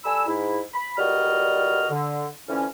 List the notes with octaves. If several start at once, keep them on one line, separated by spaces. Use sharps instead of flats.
G3 A4 G#5 B5 E6
G#2 E4
B5
C#2 A#2 G3 F#4 D#5 F6
D3
F2 D3 E3 A3 C#4